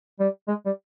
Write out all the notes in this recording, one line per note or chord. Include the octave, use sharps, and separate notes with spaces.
G3
G#3
G3